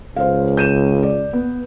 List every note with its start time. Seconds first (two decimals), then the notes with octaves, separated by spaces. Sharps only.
0.16 C#2 C5 F5
0.57 G6 D#7 E7
1.03 D5
1.33 B3